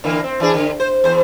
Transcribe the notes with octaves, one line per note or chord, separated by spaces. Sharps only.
D3 E3 A#3
C4
E3 D4 G#4
D3
C5
E2 C5